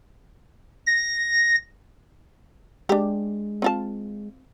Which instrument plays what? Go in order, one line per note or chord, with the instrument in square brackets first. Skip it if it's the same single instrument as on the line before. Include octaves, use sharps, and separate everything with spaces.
[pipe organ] A#6
[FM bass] G#3 [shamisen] D4 G4
[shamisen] C4 F4 A5